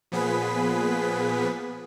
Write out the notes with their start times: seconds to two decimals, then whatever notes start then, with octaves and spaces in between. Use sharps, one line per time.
0.12 A#2 F3 B3 G#4 B4 B6